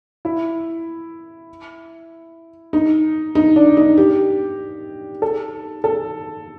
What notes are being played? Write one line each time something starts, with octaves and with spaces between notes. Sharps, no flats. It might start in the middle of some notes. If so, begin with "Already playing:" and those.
E4
D#4
D#4
D4
D#4
G4
A4
A4